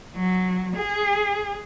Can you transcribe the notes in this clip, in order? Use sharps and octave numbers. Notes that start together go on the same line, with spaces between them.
F#3
G#4